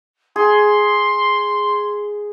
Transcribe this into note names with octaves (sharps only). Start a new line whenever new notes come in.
G#4 C6